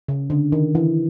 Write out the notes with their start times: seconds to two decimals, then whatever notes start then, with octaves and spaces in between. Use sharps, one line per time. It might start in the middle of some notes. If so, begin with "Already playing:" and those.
0.08 C#3
0.30 D3
0.52 D#3
0.75 E3